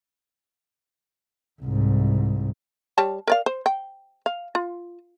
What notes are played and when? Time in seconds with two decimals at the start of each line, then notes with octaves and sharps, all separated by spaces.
1.62 C2 G#2
2.98 G3 C#5 A5
3.27 A#4 D5 F5
3.46 C5
3.66 G5
4.26 F5
4.55 F4